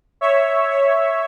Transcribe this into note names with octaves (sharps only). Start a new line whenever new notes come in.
C#5 E5
C#5